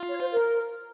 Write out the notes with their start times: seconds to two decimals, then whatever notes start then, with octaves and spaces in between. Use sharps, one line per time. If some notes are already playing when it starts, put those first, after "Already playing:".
Already playing: F4
0.08 C#5
0.19 C5
0.32 A#4